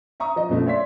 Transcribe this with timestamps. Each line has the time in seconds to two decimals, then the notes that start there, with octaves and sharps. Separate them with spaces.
0.20 E5 A#5 C#6 D#6
0.36 F3 D#5
0.49 F#2 B2 F3 A3
0.66 C#5 D5 E5 C6 B6